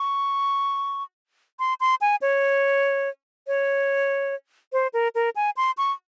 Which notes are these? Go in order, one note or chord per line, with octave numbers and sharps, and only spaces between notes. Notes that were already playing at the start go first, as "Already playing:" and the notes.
Already playing: C#6
C6
C6
G#5
C#5
C#5
C5
A#4
A#4
G#5
C6
C#6